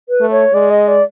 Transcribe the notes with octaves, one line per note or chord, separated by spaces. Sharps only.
B4
A3
C#5
G#3 D5
D#5
D5